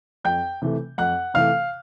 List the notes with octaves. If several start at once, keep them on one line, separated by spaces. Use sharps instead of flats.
F2 G5 G6
C3 E3 A3
F2 F#5 F#6
C3 E3 A3 F5 F6